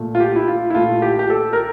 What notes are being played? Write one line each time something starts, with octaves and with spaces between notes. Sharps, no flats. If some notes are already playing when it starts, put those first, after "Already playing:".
Already playing: A#2 A3
F4
G4
E4
F4
E4
A#2 A3 F4
G4
G4
A4
A#4